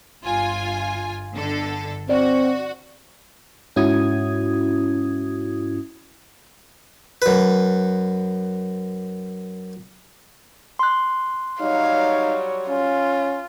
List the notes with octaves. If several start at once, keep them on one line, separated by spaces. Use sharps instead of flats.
G1 F4 G#5
G1 D3 A4
C4 F#4 D5
G#2 C#4 E4 F#4 D#6 G#6
F#2 B4
C6 F#6
F#3 G3 D#4 C#5 F5
C#4 F4